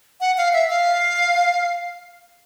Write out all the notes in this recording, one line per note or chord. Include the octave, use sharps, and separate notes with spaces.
F#5
F5
E5
F5